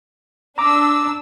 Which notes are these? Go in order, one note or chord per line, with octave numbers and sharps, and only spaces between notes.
D4 A#5 D6 E6